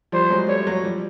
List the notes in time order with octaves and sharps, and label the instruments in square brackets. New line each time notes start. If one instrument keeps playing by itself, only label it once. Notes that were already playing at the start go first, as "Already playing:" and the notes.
[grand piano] F3 G3 [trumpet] C5
[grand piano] F#3 G#3
[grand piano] G3 A3 [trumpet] C#5
[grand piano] F#3
F3 G3